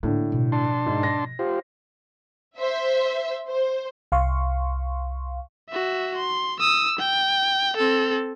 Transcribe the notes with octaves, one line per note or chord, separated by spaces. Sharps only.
A2 D3 A#3
B2 F3
D4 A5 C6
G#2
A#6
F4 G4 C5
C5 E5
C5
C2 F5 C6 C#6
F#4 E5
C6
D#6 E6
G5
C4 A4